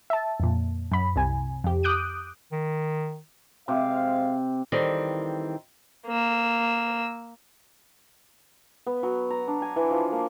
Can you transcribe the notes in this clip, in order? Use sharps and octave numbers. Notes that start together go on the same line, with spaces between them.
E5 A5
F2 A#2
F#2 B5
C2 C3 G#5
F2 G4
D6 D#6 F#6 G6 D7 D#7
D#3
C3 G#3 C5 F5 D6
D#3 E3 G3 C4 A4
A#3 E6
B3
F#3
A#5
D4
G#5
E3
F3
A#3